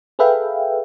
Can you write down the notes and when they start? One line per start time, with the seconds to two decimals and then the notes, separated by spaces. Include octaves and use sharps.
0.19 G#4 A4 B4 E5 F5 G5